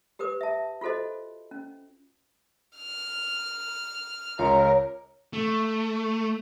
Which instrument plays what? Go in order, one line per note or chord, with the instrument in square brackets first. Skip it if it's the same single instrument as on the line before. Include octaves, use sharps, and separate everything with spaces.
[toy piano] G4 A#4 B4 D#6
E5 A5
F4 F#4 A4 C5 D#5
C#4
[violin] F6
[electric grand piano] C#2 F4 [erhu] A#4 [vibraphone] C#5
[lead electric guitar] A3